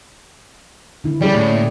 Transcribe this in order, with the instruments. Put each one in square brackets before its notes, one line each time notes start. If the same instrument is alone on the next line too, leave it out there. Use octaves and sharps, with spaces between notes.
[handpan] D3 E4
[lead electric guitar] G3 [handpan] C#4 G#4 D5
[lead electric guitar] A2
[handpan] A#3